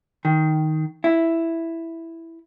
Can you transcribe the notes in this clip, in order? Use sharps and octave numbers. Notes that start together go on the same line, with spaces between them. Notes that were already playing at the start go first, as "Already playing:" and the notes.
D#3
E4